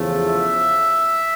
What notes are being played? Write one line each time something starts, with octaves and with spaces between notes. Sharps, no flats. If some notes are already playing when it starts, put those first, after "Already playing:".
Already playing: E2 C#3 F3 A3
E5